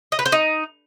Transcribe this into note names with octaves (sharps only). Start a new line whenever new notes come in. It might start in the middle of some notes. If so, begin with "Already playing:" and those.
D#5
B4
C5
D#4